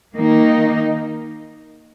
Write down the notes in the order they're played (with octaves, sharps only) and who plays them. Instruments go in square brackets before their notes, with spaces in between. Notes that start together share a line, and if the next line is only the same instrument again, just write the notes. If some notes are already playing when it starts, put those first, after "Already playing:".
[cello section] D#3 A#3 D#4